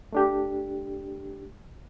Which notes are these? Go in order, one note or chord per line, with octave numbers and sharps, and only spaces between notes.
A3 D4 G4